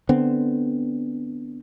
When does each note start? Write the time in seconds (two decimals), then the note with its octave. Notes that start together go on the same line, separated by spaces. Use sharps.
0.09 D3 B3 C4